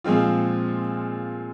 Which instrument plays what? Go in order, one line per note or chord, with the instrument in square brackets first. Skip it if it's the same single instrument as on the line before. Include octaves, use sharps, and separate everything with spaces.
[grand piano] A#2 F3 G#3 C4 F4